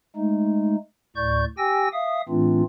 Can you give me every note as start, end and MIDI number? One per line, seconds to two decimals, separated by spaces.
0.16 0.76 56
0.16 0.76 57
0.16 0.76 63
1.16 1.45 38
1.16 1.45 45
1.16 1.45 74
1.16 1.45 85
1.16 1.45 91
1.58 1.88 67
1.58 1.88 79
1.58 1.88 80
1.58 1.88 88
1.58 1.88 94
1.93 2.21 76
1.93 2.21 77
1.93 2.21 87
2.29 2.63 45
2.29 2.63 52
2.29 2.63 57
2.29 2.63 60
2.29 2.63 62
2.29 2.63 65